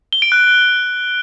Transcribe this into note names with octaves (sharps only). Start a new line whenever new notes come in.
G7
D7
F#6